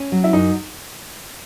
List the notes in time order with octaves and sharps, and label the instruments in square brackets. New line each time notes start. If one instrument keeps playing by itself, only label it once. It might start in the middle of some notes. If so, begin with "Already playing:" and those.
Already playing: [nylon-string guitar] C#4
F#3
[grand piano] E4
[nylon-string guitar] F#2 [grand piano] D#4